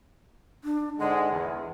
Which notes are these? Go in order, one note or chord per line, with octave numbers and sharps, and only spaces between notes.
D4
G#2 D3 G#3 F#5
E2